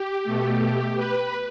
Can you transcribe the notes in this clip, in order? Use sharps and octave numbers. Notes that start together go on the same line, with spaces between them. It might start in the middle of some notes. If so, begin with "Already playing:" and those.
Already playing: G4
B2 A3
B4